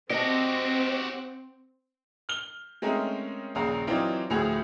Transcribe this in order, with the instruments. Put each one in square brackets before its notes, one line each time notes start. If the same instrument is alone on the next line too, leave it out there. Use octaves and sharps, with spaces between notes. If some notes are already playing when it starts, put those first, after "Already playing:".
[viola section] C4 [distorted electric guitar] F#4 G4 [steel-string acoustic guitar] D#5 A5
[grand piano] F6 G7
G#3 A3 C4 C#4 D#4 A#4
D#1 A#1 C#3 F5 A#5
E3 F#3 C4 D4 D#4 F4
D2 A2 F3 F#4 G#4 F7